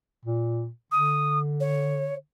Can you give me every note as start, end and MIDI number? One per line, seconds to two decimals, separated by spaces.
0.25 0.69 46
0.92 2.18 50
0.92 1.39 87
1.60 2.15 73